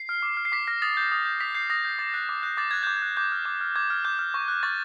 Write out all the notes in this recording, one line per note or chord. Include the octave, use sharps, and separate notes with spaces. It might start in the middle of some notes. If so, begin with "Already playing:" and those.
Already playing: C7
F6
D6
F6
C7
D6 B6
F6 A#6
D#6 A6
G6
D#6
G6
D#6 B6
G6 C7
D#6 A#6
G6
D6 A6
F#6 A#6
D6
F#6 G6
D6 A6
F#6 G#6
D6 G6
G#6
F#6
D6 G6
F6
D6
F6
D6 G#6
F6
D6 G6
F6
C#6
F#6
C#6 A6